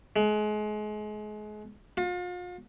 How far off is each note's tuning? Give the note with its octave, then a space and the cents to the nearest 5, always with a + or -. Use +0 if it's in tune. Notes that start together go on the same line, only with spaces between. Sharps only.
G#3 +30
F4 +40